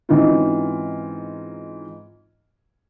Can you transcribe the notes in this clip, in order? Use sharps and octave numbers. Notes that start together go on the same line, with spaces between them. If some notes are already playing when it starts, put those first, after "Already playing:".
G#2 E3 C4 C#4 D#4 F4